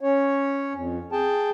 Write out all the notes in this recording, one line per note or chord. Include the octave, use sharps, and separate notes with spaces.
C#4 C#5
F2
G#4 G5 A5